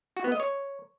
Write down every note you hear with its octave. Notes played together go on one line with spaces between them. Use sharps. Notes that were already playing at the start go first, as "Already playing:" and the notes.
F#4
B3
D#5
C#5